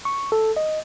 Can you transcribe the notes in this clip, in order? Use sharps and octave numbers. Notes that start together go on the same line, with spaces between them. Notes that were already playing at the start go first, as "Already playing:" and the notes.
C#6
A4
D#5